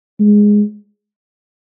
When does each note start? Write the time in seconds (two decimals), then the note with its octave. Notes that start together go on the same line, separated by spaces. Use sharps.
0.20 G#3